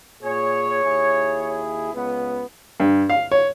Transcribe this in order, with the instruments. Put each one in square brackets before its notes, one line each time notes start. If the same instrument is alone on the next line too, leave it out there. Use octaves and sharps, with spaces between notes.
[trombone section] A#2 G#4 [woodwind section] C#5
[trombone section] D#2 E4 G#4
C#2 B3
[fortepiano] G2
F5
C#5